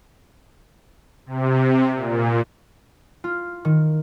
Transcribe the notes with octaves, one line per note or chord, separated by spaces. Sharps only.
C3
A#2
F4
D#3